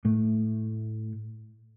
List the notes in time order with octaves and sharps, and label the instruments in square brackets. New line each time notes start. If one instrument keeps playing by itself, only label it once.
[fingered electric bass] A2 A3